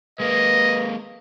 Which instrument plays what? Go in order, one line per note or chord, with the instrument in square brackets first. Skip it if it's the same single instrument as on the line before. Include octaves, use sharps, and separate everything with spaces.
[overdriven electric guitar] G#3 A#3 [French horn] B4 [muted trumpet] D#5